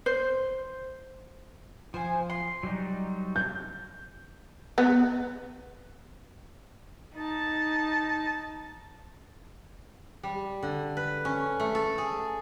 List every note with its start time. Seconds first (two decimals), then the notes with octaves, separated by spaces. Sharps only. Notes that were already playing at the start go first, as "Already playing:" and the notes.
0.06 C5
1.94 F3 C5 G#5
2.30 C6
2.63 F#3 G3 D#4
3.36 G6
4.78 B3
7.15 D#4 A5
10.23 G3
10.63 D3
10.97 B4
11.25 C#4
11.60 A3
11.75 A4
11.98 G#4